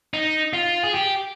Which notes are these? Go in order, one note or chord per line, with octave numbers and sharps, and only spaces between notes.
D#4
F4
G#4
G4